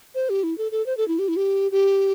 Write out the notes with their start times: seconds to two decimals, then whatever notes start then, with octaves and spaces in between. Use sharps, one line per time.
0.15 C5
0.30 G4
0.43 E4
0.58 A4
0.72 A4
0.86 C5
0.97 A4
1.08 E4
1.19 G4
1.28 E4
1.37 G4
1.72 G4